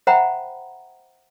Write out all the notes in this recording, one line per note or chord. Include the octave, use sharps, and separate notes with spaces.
C5 E5 F#5 G5 A#5 B5